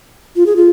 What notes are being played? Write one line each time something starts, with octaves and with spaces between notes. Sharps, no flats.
F4
G#4
F4